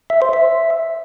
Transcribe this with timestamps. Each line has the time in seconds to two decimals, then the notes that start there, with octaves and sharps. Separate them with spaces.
0.10 E5
0.22 C5
0.33 E5